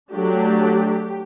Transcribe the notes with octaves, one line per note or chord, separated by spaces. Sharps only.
F#3 A3 D4 G4